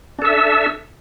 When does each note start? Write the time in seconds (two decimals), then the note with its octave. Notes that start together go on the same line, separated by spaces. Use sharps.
0.19 D4
0.22 A4
0.25 E5